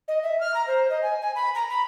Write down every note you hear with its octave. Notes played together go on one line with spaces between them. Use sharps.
D#5
E5
F6
A#5
C5
D#5
G#5
G#5
B5
A#5
B5